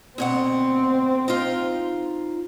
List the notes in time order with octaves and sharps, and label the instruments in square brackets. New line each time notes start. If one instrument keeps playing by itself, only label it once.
[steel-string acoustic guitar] D2 B2 F#5 [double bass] C4
[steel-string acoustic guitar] D#4 F4